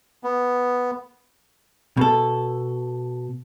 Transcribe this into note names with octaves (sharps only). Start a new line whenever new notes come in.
B3
B2 A4